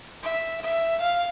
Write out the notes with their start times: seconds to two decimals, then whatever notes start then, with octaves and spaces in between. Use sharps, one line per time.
0.23 E5
0.62 E5
1.01 F5